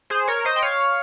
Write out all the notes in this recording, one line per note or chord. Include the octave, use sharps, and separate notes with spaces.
G#4 C5
A#4 C#5
C5 D#5
G5
C#5 F5